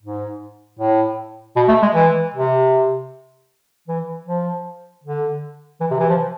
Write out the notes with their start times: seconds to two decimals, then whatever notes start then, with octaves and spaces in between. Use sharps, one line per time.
0.02 G#2
0.79 A2
1.56 B2
1.68 A3
1.82 G#3
1.95 E3
2.34 C3
3.87 E3
4.26 F3
5.04 D3
5.80 E3
5.91 C3
6.00 E3
6.09 F3